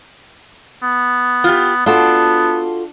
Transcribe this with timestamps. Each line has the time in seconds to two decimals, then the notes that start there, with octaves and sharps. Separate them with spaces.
0.83 B3
1.44 F4 G4
1.86 B3 D4 F4 F#4 A4